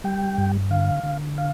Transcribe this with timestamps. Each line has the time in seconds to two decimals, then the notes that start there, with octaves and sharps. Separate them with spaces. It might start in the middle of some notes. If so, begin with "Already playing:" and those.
0.04 G3 G5
0.38 G2
0.70 D3 F5
1.03 D3
1.38 F5